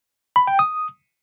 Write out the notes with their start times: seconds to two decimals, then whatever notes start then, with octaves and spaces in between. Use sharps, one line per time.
0.36 B5
0.47 G5
0.59 D#6